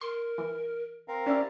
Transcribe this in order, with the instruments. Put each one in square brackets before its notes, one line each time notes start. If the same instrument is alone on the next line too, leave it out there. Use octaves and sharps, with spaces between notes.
[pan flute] A#4 [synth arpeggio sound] C6
[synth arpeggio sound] E3
[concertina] C4 A#4 F5
[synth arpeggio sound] C#4 E4 [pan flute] G4 [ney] D5